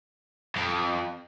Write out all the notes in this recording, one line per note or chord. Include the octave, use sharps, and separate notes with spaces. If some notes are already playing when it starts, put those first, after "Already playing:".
F2